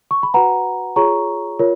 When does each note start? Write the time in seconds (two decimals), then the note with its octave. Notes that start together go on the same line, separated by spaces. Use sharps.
0.11 C#6
0.23 B5
0.34 F#4 B4 F#5 A#5
0.96 F4 G#4 C#5 A#5 C#6
1.59 F4 A#4 C#5